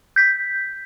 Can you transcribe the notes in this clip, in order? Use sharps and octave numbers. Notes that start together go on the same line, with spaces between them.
G6 B6